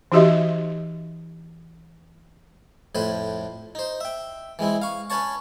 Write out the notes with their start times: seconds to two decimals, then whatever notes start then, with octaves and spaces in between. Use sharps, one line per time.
0.12 E3 D#4 F#4 G4 D#5 E5
2.95 F2 A2 B4 C5
3.75 D#4 C5
4.01 E5 G5
4.59 E3 G#3 C4 E4
4.82 F5 C#6
5.10 C#4 B4 C#5 A5 C#6